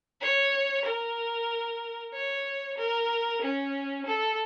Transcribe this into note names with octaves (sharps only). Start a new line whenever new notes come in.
C#5
A#4
C#5
A#4
C#4
A4